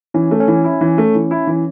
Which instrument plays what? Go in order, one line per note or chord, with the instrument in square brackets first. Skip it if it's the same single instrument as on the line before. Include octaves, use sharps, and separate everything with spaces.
[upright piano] E3 [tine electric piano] C#4
[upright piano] A3
[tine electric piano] C#4
[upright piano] E3
E4
E3
A3
E3
E4
E3